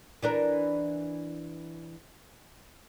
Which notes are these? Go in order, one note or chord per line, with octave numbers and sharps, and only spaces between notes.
E3 D4 A#4